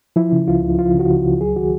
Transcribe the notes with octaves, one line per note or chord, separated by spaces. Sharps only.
F3 E4
C#3
C#2 F4
C#2
F3 F4
C#3 F#4
C#2
C#2
F#3 G#4
D#3 F#4